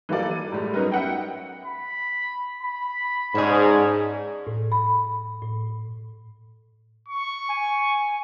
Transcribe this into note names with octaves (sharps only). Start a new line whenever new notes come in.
E3 F#3 G3 A#3 A4 D5
D#7
A2 G3 G#3
F#3 B3 C#4 D#4 A#4 B4
E5 F#5 G5
B5
B5
G#2 C#4 D4 G#4
A2
B5
A2
C#6
G#5